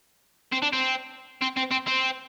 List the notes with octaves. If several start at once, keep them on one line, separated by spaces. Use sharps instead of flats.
C4
D4
C4
C4
C4
C4
C4